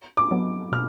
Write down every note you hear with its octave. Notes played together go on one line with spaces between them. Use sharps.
D6
F#3 B3
B2 F6